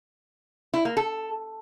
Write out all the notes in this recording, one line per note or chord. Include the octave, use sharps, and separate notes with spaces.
E4
A#3
A4